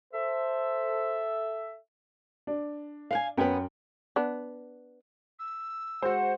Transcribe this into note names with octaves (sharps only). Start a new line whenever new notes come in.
A4 C5 E5
D4
F5 F#5 G#5
F#2 B3 C#4 B4 G5
B3 D4
E6
G#3 F#4 C5 F#5